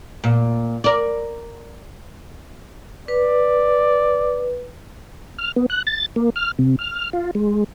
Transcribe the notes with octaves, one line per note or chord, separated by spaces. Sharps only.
A#2
A#4 D5
B4 D5
F6
B3
F#6
A6
A#3
F6
C3
F6
F4
G#3